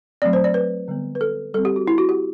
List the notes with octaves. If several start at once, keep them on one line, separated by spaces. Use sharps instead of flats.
F#3 A3 C4 D5
C5
D5
B4
D3 G3 B3
B4
A4
G3 C4 A4
G4
F#4
E4
F#4
G4